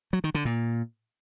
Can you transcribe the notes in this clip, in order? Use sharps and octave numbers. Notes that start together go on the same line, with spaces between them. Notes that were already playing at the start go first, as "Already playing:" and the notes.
F#3
D#3
D3
A#2